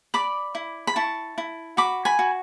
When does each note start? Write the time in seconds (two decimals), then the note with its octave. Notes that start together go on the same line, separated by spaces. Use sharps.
0.14 D5 B5 D6
0.55 E4
0.87 B5
0.96 E4 A5 C#6
1.38 E4
1.77 F#4 B5 D6
2.05 G#5 B5
2.19 F#4